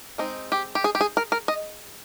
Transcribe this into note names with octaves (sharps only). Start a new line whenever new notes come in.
G#3 C4 D#4
G4
G4
G#4
G4
G#4
A#4
A#4
D#5